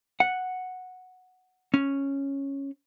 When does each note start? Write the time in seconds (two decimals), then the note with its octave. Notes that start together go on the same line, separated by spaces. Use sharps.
0.20 F#5
1.74 C#4